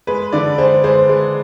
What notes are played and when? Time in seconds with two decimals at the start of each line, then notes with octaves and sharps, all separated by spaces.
0.07 G#3 B4
0.32 D3 D5
0.58 G#3 C5
0.84 G#3 C5
1.09 G#3